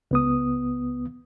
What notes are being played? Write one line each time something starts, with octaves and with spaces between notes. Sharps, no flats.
C#2 B3 D#6